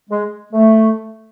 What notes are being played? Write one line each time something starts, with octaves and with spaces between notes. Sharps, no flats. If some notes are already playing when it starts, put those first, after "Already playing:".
G#3
A3